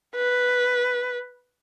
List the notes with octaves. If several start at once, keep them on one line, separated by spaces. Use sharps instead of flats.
B4